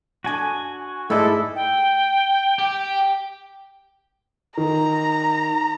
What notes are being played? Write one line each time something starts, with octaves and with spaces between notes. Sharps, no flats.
D4 F#4 D#5 G#5
G#2 G#3 A3 E4 A4 D5 D#5
G5
G4
D#3 A#5